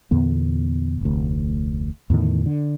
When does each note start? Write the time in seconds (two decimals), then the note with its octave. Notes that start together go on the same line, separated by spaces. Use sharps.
0.11 E2 A#2 D3 B3
1.01 F1 D2
2.10 E2 A2 D3 D#3
2.46 D3